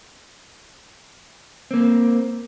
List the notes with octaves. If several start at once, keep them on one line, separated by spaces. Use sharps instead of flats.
A#3 C4